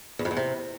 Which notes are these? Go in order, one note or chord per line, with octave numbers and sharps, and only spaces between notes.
E2
F2
E2
C3